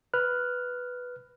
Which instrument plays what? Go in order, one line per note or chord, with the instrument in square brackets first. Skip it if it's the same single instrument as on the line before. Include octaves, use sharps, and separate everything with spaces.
[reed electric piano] B4 F6 F#6